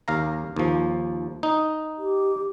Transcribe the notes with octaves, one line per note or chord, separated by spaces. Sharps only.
D#2 F5 A#5
D#2 F3
D#4
G4